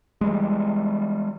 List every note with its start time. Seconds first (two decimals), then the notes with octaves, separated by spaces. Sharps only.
0.21 E3 G3 G#3